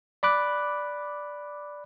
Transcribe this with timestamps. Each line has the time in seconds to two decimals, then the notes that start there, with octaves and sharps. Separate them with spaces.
0.23 D5 B5 D6 F#6